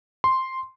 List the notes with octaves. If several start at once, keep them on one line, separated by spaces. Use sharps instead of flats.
C6